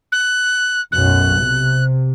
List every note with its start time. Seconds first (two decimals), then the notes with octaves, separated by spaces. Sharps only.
0.12 F#6
0.92 B1 F#2 F#6
1.38 C3